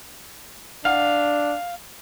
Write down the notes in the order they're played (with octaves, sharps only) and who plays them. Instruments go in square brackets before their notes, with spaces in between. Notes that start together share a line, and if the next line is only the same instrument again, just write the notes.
[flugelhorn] D4 [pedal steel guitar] F5 [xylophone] F#5 F6